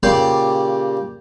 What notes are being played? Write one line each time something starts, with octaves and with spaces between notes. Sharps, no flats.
A#2 C#3 G4 D5 G5 C6